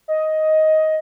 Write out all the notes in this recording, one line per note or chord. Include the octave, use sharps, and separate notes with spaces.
D#5